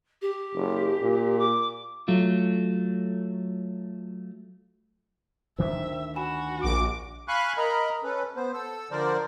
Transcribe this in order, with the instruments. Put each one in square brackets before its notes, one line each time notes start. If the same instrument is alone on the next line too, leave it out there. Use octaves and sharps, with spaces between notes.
[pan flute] G4
[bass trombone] F#1
A#2
[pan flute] D6
[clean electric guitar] F#3 A3 F4
[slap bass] D2 D#3 D4 [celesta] C5 [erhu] E5
[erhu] F#4 [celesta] G#5 B5 E7
[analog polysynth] A#1 D6
[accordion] F5 G#5 B5 C#6 F#6
A#4 D#5 A#5 B5
C#4 A4 B4
B3 C5
A4 E6
D3 F3 A#4 C5 D5